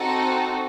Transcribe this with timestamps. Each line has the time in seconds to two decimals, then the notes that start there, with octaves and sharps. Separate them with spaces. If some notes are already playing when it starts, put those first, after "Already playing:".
Already playing: C4 D#4 F#4 A4